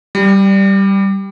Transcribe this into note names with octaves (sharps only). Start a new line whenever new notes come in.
G3